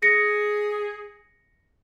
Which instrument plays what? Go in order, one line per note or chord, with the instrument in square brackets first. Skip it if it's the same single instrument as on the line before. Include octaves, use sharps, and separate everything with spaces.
[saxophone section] G#4 [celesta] A#6 C#7